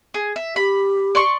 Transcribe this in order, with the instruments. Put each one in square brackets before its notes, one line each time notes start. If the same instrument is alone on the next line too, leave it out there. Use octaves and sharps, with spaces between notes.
[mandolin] G#4
E5
[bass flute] G4 [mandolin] B5
[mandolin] D5 C6 C#6